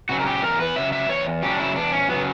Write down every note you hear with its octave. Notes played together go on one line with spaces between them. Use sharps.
C#3 F#3 F#4
A#4
G4
E2 A#4
B4
C#3 F#3 E5
E5
E2 C#5
C#3 F#3 G4
D4
E4
E2 D4
C#4
C#3 F#3 B3